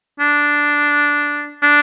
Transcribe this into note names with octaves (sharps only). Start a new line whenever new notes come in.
D4
D4